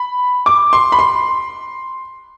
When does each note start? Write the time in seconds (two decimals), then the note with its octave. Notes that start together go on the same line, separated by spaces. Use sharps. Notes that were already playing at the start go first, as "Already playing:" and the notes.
Already playing: B5
0.46 D6
0.73 C6
0.92 B5
0.99 C6